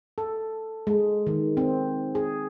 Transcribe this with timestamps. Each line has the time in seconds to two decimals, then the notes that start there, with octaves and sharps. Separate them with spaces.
0.18 A4
0.87 G#3
1.27 D#3
1.57 C4
2.15 G#4